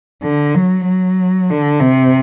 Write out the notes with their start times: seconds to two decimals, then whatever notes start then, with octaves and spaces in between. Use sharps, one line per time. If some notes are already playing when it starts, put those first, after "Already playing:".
0.23 D3
0.55 F#3
0.86 F#3
1.50 D3
1.81 C3